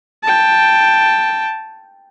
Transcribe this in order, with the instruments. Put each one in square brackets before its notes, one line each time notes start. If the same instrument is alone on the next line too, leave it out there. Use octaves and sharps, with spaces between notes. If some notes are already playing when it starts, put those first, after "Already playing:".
[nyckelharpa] G5 A5